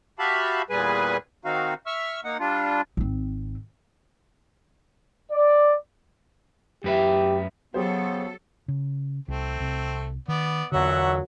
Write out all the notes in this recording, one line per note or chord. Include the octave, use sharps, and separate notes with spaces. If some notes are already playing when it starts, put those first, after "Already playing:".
F#4 G4 E5 F5 A5 B5
E2 A#2 G3 G#4 B4 G#5
D#3 C4 D#4 F#4 F5
E5 C#6 E6 F6
A#3 D#4 F#5
G3 D4 F4
G#1 C4
D5
F#2 G4 B4 E5
C#3 F#3 B3 G4 A4 C5
C#3
C2 A3 C4
C2
D#3 B3 D5
B1 E2 A#2 D3 F#3 E5 F#5